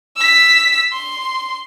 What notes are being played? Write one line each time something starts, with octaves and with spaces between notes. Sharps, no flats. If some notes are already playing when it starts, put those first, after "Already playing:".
E6 B6
C6